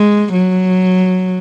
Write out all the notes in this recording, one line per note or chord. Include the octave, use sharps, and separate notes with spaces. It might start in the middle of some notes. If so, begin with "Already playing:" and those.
Already playing: G#3
F#3